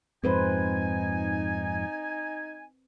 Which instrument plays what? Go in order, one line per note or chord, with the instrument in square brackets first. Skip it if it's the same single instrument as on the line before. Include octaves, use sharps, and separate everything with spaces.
[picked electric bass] F2 G#2 [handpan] C4 B4 C5 [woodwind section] D#4 G#5